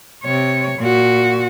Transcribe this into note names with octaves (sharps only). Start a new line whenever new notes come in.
C3 C#5
A#2 F#4